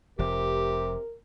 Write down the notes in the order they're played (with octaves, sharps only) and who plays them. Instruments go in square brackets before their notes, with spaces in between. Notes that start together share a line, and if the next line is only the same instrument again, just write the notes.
[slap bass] F1 F3 [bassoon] C3 [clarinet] G4 [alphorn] A#4